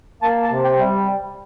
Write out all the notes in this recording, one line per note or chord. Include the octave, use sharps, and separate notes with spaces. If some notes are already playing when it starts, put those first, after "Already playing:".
A#3 A5
A5
C3
G5
G3